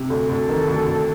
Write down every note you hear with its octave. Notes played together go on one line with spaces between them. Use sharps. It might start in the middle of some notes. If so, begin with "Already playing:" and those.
Already playing: C3
D2 A4
D2
D#3
D2
D2